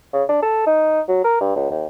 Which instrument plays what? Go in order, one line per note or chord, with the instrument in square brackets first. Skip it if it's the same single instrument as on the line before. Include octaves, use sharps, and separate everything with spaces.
[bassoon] C#3
D4
A4
D#4
F#3
A#4
G2
C#2
D#2